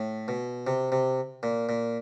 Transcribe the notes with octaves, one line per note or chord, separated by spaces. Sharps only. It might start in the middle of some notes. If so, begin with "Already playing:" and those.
Already playing: A2
B2
C3
C3
A#2
A#2